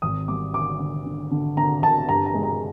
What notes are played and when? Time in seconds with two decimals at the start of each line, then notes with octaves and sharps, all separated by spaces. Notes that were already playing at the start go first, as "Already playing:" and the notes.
0.02 G#1 D#6
0.28 G3 D6
0.53 D3 D6
0.79 D3
1.06 D3
1.31 D3
1.57 D3 A#5
1.83 D3 A5
2.09 G2 A#5
2.26 A#5
2.34 G#3
2.43 A#5